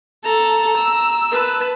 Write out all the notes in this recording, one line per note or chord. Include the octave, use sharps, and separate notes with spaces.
A4 A#5
E6
B4 A5